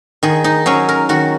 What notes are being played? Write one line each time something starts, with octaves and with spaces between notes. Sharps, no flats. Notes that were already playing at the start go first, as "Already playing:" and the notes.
D#3 G#4
D#4
F#3 C#4 G#4
A#4
D#3 F#4